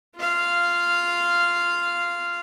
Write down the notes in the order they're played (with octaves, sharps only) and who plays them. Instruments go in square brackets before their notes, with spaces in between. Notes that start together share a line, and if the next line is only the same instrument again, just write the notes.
[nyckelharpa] F4 F5